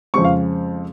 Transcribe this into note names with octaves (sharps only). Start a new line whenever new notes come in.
F2 C#3 G#3 C4 C#6
F5